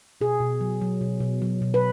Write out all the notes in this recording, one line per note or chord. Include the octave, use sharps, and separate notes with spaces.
B2 G#4
B2
F#3
F#3
B2
B2
F#3
B2
B4